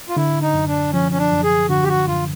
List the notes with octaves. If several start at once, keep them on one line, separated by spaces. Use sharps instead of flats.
F4
D3 E4
D#4
F#2
D4
F3 C#4
C#4
D4
F#2
G#4
D3 F#4
G4
F#4
F#2 F4